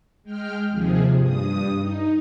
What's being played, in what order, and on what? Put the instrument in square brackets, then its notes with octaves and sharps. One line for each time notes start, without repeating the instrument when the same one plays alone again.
[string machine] G#3 G5 F6
D#2 C3 F3 G#4
G2 D#6
D#4